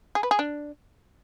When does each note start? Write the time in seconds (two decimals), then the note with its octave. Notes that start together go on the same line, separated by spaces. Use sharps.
0.15 G#4
0.23 B4
0.31 G#4
0.39 D4